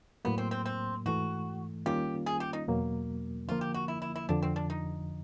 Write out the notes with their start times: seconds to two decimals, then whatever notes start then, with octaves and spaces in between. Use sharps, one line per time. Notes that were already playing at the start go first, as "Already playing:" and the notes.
0.25 A2 F#3 A#3 B3
0.38 C4
0.51 C4
0.66 C4
1.06 G#2 E3 A3 F#4
1.86 D#3 G3 A#3 C#4 F4 G4
2.26 G#4
2.40 G4
2.53 D#4
2.68 E2 B2 F#3 A#3
3.48 D3 F3 A#3 F4
3.61 G4
3.74 F#4
3.88 E4
4.02 E4
4.16 E4
4.29 F2 D3 F3 D4
4.43 C4
4.56 D4
4.70 D#4